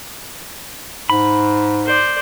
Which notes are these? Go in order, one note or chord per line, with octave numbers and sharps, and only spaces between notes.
G#2 B5
C5 D5